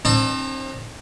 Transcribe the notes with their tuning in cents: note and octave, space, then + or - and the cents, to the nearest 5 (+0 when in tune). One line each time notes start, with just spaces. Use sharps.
C4 +35 D#4 -40 A5 +0